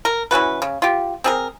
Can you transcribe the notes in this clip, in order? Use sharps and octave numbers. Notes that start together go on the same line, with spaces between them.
A#4
E3 C#4 F#4 B4
C#3
F4 G4
C4 G#4 A#4